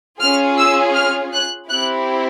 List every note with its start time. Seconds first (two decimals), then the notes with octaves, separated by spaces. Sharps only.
0.20 C#4 F4 G#4 F6
0.57 E6
0.95 F6
1.33 F#6
1.69 C4 E4 G4 F#6